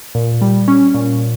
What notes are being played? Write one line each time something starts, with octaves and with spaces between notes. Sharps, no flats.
A#2
G3
C#4
A#2